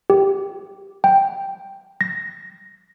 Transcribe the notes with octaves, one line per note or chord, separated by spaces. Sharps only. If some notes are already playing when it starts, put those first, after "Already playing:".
G4
G5
A#6